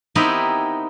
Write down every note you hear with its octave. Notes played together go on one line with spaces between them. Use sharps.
B3 C4 D#4 E4 G4 A#4